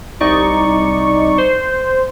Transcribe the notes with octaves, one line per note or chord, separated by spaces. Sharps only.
C2 D#4 D5 C#6
C5